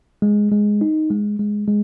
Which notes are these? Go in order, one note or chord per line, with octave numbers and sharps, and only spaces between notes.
G#3
G#3
D#4
G#3
G#3
G#3